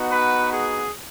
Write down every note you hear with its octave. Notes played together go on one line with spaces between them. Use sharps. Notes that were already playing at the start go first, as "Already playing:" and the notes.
Already playing: B3 D#4 F#4
B4
G#4